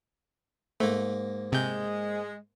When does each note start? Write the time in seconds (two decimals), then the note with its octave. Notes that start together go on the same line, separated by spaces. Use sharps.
0.80 G#2 A3 A#3
1.52 C3 G#3 G6